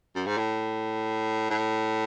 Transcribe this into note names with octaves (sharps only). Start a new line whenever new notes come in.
F#2
G#2
A2
A2